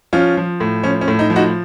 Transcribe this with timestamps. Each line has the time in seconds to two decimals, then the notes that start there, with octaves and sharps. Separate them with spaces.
0.13 F3 C#4 F4
0.37 F3
0.60 A2
0.83 F3 C#4
1.01 C#4
1.08 A2
1.19 D#4
1.30 F3
1.36 D#4 F#4